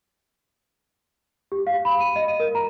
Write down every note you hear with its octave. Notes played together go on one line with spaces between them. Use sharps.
G4
F5
B5
D#7
D#5
D#7
A#4
A#5